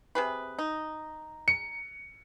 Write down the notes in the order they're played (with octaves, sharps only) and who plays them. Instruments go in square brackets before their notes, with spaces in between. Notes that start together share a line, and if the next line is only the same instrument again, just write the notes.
[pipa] C3 G#4 B4
D#4
[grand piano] C#7